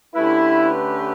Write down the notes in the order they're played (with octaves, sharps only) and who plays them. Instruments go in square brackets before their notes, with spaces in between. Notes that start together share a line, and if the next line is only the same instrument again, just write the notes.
[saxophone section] D3 A3 C#4 G4 B4 [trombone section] E4